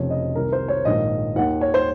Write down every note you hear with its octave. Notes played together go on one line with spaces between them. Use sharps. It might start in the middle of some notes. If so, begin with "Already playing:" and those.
Already playing: F1 F2 C#3 C#5
D#5
C2 C3 D#3 A#4
C5
C#5
A#1 G#2 D#3 D#5
D#2 D#3 F#5
C#5
C5